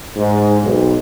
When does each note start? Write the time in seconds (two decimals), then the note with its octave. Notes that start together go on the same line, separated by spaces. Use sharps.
0.16 G#2
0.63 B1